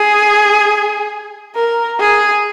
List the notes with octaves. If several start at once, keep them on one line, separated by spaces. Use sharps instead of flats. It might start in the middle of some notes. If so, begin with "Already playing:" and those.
Already playing: G#4
A#4
G#4